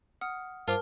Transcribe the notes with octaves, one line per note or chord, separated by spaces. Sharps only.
F#5 D#6 F6
G2 F4 A#4 C5 A5 D6 F6